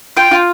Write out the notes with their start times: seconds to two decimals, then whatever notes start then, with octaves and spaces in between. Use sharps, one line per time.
0.17 F4 G5
0.31 F4